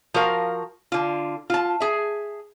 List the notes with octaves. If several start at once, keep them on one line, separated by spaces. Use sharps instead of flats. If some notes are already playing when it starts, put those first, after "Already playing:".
F3 F#4 A#4 F5
D3 F4
F4 A5
G#4 E5